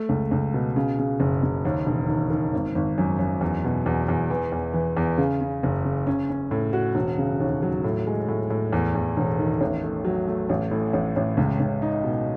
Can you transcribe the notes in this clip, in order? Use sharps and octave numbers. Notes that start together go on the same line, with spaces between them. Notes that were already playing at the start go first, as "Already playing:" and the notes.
Already playing: A3
C#2
C#2
B2
C#3
C#3
F#1
F#1
D#2
E1
D#3
D#3
G#1
G#1
F#2
F#2
E2
B2
E2
E2
E3
E2
E3
E2
C#3
C#3
F#1
C#3
C#4
C#4
A2
F#4
E1
C#3
D#2
F#3
A2
G#3
A2
A2
E2
E2
E1
D#3
A1
A3
F#3
A3
A1
A2
A1
A1
C#2
C#2
D#4
B2